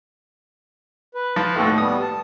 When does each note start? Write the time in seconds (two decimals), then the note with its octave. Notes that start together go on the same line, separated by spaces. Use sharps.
1.15 B4
1.36 F3 F4
1.56 D#2 A2 C4 F#4 A4
1.78 G3 B3 D#6
2.01 A5